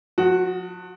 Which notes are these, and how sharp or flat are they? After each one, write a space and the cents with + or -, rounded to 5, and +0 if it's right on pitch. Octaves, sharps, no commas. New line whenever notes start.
F3 +35 F#4 +0